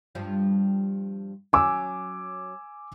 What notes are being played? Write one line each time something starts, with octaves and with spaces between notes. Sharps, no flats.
G2 F3 G3
F#3 C#4 G#5 D6 E6